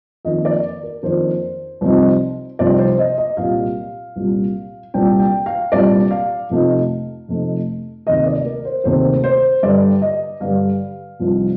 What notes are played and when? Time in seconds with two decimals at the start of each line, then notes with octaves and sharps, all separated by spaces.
0.25 F2 D#3 A#3 D4 D#5
0.45 D5
0.83 A#4
1.03 F2 D#3 A#3 D4 C5
1.81 C2 C3 F3 C4 D#4
2.59 C2 C3 F3 C4 D#4 D5
2.79 C5
2.99 D#5
3.18 D#5
3.37 C2 A#2 G3 F5
4.16 C2 A#2 G3
4.94 C2 A#2 G3 D4 G5
5.19 G5
5.46 F5
5.72 C2 A#2 G3 D4 D5
6.11 F5
6.50 F2 C3 F3 A3 D#4
7.28 F2 C3 F3 A3 D#4
8.07 D2 C3 D#3 A#3 D#5
8.26 D5
8.46 A#4
8.65 C5
8.84 D2 C3 D#3 A#3 C5
9.24 C5
9.63 G2 D3 G3 D5
10.02 D#5
10.40 G2 D3 G3 F5
11.20 C2 C3 F3 C4 D#4